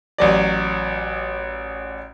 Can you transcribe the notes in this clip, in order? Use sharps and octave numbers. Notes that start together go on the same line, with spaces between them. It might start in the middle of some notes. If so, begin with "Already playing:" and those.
A1 F#3 D5